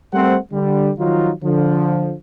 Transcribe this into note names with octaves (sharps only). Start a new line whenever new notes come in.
G3 A3 C4 A#4 C5 F#5
D3 G3
D#3 F3 F#3 D#4 F4
D3 F3